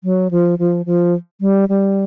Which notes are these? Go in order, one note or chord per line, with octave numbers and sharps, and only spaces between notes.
F#3
F3
F3
F3
G3
G3